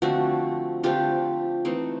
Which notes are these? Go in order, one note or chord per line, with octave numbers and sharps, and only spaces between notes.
D3 F3 A3 C4 F#4
D3 F3 A3 C4 F4 G4
E3 A3 C4 D#4